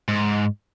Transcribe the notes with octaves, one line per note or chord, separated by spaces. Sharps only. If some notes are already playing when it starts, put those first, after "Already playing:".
G#2